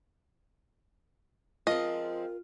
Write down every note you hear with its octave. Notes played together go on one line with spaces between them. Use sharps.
F3 G#3 C4 F4 A#4 D#5